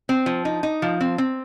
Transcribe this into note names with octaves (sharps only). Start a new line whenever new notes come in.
C4
F3
D#4
D#4
F3
C4
C4